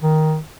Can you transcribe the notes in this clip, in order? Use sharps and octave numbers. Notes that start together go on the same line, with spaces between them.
D#3